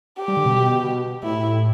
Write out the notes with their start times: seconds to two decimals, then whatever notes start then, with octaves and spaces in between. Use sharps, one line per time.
0.18 G4
0.28 G3
0.37 D3
0.45 B2
1.23 A2 E4